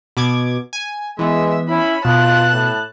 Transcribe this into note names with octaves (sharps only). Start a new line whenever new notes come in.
B2 D6 G#6
G#5
E3 G#3 B3 E5
C#4 E4 B5
B2 F4 A5 F#6
A2